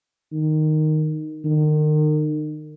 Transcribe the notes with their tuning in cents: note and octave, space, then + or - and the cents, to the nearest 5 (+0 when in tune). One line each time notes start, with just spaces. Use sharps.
D#3 -10
D#3 -35